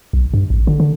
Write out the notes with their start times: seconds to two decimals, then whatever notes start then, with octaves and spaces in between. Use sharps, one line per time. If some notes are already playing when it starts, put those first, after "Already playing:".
0.13 B1
0.34 G2
0.50 A1
0.67 D3
0.80 D3